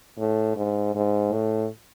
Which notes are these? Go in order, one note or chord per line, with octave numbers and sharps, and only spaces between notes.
A2
G#2
G#2
A2